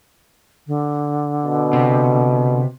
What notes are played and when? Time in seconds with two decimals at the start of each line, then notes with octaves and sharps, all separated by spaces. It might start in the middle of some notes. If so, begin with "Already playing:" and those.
0.67 D3
1.44 B2
1.73 C3